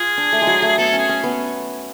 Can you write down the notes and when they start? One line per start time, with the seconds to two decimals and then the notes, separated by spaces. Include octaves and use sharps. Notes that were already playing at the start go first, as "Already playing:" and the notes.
Already playing: F4 G#4
0.18 D4
0.32 A3
0.42 G#3
0.47 F#3
0.62 A3
0.78 B3 A4
0.93 C#4
0.98 G#4
1.09 C#4
1.24 B3